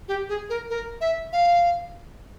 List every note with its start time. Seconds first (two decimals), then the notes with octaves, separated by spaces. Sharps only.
0.08 G4
0.29 G#4
0.50 A#4
0.70 A#4
1.01 E5
1.33 F5